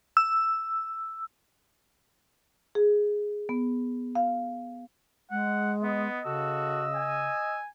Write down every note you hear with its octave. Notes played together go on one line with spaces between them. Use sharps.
E6
G#4
B3
F5
G#3 F#5
B3 D#5
C#3 F#4 A4 E6
G#5